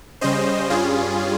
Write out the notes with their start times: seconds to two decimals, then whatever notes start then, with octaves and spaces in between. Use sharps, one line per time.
0.21 C#3 G3 C#4 C5 D#5
0.70 G2 G3 C#4 F4 G#4